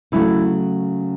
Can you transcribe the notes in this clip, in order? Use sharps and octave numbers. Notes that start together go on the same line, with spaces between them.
C#3 F#3 A3 E4